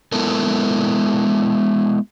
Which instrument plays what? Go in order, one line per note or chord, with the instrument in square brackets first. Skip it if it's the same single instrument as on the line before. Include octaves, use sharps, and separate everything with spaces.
[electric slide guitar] G#3 B3 E4 A4 A#4